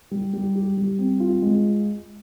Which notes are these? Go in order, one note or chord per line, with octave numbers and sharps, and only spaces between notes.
G3
G3
G4
G3
C4
F4
G#3